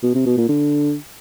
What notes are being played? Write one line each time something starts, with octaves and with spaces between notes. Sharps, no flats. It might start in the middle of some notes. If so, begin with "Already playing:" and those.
B2
C3
B2
A#2
D3